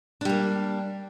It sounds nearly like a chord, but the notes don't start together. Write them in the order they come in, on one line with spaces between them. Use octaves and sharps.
D4 G3 A#3